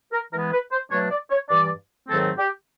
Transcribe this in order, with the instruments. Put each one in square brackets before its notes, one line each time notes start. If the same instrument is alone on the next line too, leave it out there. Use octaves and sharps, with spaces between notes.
[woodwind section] A#4
E3 G#3 B3 A#4
B4
C5
B2 F#3 A3 D4 C#5
D5
C#5
G2 E3 G3 D5
G#2 D#3 F#3 A3 C4 A4
G4